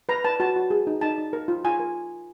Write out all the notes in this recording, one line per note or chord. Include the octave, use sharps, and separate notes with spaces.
B4 A#5
B4 A5
F#4 A5
F#4
G#4
D#4
D#4 A5
D#4
A#4
F4
F4 G#5
A#4